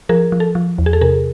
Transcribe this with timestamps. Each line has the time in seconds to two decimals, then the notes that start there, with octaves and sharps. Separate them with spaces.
0.09 F3 G#4 A#4
0.32 F3
0.40 A4
0.55 F3
0.78 E2
0.86 G#4
0.93 A4
1.01 C3 G#4 A#4